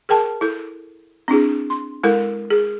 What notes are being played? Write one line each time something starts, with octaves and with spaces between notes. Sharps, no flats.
G#4 A#4 G5 A5
E4 A4
C4 D4 E4 G#4
C6
G#3 E4 A4 A#4
G#4